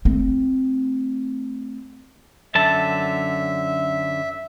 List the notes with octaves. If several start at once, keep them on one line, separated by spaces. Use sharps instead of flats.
A3 C4
F#2 D3 E5 A5